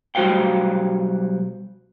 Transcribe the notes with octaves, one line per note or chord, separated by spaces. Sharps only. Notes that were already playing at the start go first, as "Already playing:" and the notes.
B1 G3 F#4 C5 F5 G5